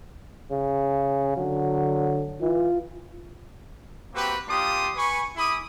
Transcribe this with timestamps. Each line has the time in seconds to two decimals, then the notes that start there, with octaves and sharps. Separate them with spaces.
0.51 C#3
1.37 D3 F#3
2.41 E3 F4
4.14 A#3 C4 F#4 G4 B4
4.48 A#3 D4 F4 G4 C6 D#6
4.96 B4 G#5 B5 C#6
5.36 E4 G#4 B5 D6 D#6